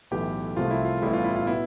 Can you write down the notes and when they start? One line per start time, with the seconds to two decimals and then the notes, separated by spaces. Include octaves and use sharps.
0.11 B1 A2 E3 B3 G4
0.57 C2 C3 F3 A3 F4
0.71 E4
0.85 F4
1.02 A1 A2 G3 B3 E4
1.13 F4
1.24 E4
1.36 F4
1.47 B2 B3 E4